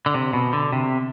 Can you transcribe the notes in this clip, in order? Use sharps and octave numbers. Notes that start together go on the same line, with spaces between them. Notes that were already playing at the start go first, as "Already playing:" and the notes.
D3
C3
B2
D3
C3